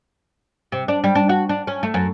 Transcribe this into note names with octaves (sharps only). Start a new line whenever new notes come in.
C3
D4
G3
D4
F#4
D4
C#4
A3
F#2